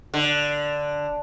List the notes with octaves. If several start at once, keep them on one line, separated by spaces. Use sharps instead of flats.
D3